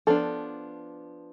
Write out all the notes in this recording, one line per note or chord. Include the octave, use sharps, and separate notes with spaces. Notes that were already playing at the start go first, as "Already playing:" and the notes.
F3 B3 D4 A4